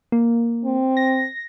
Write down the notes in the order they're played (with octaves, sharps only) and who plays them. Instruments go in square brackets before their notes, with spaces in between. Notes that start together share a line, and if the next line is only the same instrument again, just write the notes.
[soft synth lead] A#3
[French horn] C4
[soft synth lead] A#6